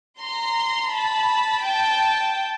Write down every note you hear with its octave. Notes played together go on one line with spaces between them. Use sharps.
A#5 C6
A5 B5
G5 A5